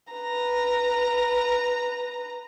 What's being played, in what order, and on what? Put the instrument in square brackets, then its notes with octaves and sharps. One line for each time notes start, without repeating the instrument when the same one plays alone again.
[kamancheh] B4 A#5